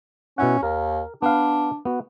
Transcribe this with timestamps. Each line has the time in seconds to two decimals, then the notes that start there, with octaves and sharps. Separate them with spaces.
0.38 B2 C#4 E4 F#5
0.63 D#2 A#4
1.22 B3 D4 B4 F5
1.85 B3 F#4